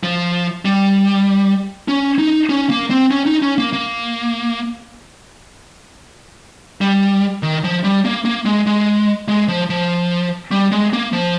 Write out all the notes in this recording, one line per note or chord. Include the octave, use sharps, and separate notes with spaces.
F3
G3
C#4
D#4
C#4
A#3
C4
C#4
D#4
C#4
A#3
A#3
G3
D#3
F3
G3
A#3
A#3
G#3
G#3
G#3
F3
F3
G3
G#3
A#3
F3